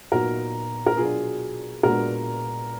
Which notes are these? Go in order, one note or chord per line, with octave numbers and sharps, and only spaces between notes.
A#2 F#3 B3 D#4 F#4 A#4
A#4
B2 F#3 D4 F4 G#4
A#2 G#3 B3 D4 F#4 A#4